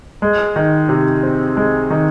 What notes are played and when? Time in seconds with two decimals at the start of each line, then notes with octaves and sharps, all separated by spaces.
0.22 G#3
0.56 D#3
0.89 C3
1.23 C4
1.57 G#3
1.90 D#3